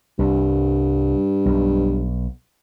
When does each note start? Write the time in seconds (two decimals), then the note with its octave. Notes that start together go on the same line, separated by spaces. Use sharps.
0.19 C2 G2
1.45 B1